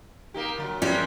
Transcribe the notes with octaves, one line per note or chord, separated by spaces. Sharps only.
A#3 D#4 G4
A#2 D3 F#3
E3 G3 G#3 A#3 C#4